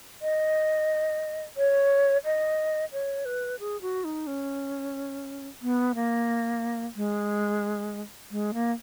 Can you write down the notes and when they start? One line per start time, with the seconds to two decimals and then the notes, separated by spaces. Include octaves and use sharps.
0.22 D#5
1.57 C#5
2.24 D#5
2.92 C#5
3.25 B4
3.60 G#4
3.82 F#4
4.04 D#4
4.27 C#4
5.62 B3
5.95 A#3
6.96 G#3
8.31 G#3
8.54 A#3